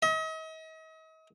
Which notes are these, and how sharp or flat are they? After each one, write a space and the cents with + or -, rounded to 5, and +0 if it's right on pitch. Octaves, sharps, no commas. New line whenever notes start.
D#5 +40